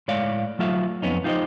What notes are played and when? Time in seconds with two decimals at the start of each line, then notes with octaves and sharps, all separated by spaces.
0.08 A2 G#3 C#5 D5 F5
0.59 F#3 A3 F4 E5 F5
1.02 F2 B3 C#4 D#4
1.24 D#4 F4 G4 G#4 C5 D#5